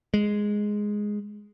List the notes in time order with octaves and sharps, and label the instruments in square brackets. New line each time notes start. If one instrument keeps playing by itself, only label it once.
[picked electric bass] G#3